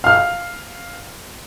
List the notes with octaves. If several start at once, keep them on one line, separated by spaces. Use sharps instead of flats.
F5 F6